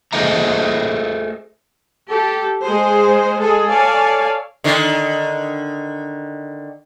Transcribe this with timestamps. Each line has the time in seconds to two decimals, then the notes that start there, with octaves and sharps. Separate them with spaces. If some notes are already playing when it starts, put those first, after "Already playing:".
0.13 G#4 A4 C5 D#5 E5 A#5
2.09 G4 A4
2.63 G#3 G#4 C5
3.39 G#3 G#4 A4
3.69 A4 C#5 D5 F5 G#5 A5
4.64 D3 D#3